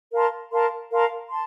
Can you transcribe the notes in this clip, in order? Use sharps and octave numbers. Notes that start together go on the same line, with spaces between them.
A#4 F5 A5 C6
A#4 F5 A5 C6
A#4 F5 A5 C6
A5 C6